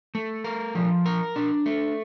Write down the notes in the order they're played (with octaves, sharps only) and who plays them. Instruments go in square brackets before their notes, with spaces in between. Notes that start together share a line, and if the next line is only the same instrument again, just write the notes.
[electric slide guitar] A3
A#4
F3
A#4
D4
A3